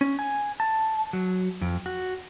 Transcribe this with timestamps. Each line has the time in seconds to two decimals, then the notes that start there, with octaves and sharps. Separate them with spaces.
0.01 C#4
0.19 G#5
0.60 A5
1.13 F#3
1.61 F2
1.86 F#4